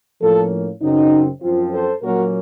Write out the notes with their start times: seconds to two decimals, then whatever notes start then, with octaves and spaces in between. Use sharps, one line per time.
0.21 A2 F3 A#3 C#4 F4 A4
0.82 F#2 C#3 F#3 C4 D#4
1.42 F#2 F3 C4 F4
1.72 A4 C5
2.02 A#2 F#3 A#3 C#4 F#4 A#4